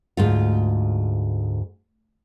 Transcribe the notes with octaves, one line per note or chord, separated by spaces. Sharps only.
D2 G#2 F4